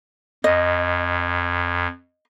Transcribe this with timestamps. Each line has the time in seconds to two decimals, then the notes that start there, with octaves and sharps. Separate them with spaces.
0.44 F2 D#5